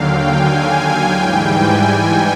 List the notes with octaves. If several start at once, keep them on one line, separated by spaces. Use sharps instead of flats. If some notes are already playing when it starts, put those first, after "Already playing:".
Already playing: D#2 D3 F#3 F5 G5
G#5
G#5
G#2 E3 G3 G5
G#5
G5